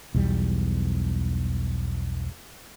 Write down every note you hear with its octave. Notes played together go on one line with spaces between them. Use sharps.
B1 E2 G3